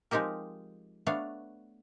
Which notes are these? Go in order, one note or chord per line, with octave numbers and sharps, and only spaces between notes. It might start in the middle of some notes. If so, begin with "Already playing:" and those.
F3 G#3 C4 D#4 G4 A#4
A3 B3 D4 C#5 F5